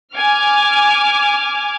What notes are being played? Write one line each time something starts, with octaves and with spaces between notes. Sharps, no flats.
G#5 D6 F6